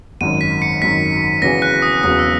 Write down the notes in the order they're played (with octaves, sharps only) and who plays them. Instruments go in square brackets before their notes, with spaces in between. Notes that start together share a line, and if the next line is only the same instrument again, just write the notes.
[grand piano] G#1 F#2 D#3 [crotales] D#7
[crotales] B6
C#7
[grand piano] G#1 F#2 D#3 [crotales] B6
[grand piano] E1 E2 C#3 F#3 B3 [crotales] A#6
[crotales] F#6
D#6
[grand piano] E1 E2 C#3 F#3 B3 [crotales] D#6
[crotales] E6